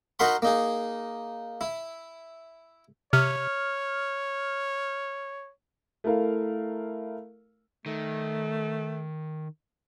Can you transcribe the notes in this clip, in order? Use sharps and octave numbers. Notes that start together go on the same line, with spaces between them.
D#4 F#4 A#4 F#5 B5 C6
A#3 D#4 G#4
E4
C3 C#5 F6
A3 E4 A#4 F5
D#3 A3